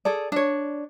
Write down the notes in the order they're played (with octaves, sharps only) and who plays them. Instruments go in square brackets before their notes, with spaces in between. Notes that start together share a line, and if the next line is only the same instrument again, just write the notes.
[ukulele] G#4 A4 D5
D4 C#5